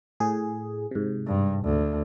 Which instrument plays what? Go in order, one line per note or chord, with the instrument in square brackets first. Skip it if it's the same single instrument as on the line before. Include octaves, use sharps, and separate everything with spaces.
[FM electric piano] A2 G#4
G#2 C3
[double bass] G2
D2